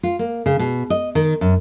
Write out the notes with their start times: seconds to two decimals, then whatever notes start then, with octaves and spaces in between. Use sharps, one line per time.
0.03 F4
0.19 A#3
0.46 C#3
0.59 B2
0.90 D#5
1.15 D#3
1.41 F#2